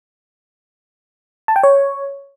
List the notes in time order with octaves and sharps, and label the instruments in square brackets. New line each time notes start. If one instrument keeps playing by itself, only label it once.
[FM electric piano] A5
G5
C#5